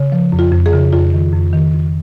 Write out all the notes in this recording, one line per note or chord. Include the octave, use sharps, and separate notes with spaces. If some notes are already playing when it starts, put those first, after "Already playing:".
Already playing: C#3
F3
F2
F4
F2
G#4
C#3
F2 F4
D#3
F2
D#3
F2